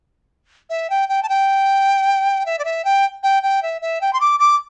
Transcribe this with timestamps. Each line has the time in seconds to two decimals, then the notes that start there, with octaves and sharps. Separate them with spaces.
0.70 E5
0.90 G5
1.09 G5
1.23 A5
1.29 G5
2.46 E5
2.59 D5
2.65 E5
2.85 G5
3.23 G5
3.43 G5
3.63 E5
3.82 E5
4.01 G5
4.13 C6
4.21 D6
4.40 D6